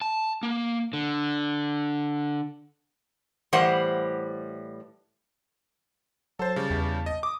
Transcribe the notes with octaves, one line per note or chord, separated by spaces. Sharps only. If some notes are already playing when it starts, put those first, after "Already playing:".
A5
A#3
D3
A2 E3 G3 C5 F#5
F#3 A4 C5 A5
C#3 G3
E2
D#5
D6 D#6